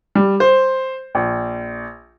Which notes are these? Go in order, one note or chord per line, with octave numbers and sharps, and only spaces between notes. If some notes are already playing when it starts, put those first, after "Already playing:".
G3
C5
A#1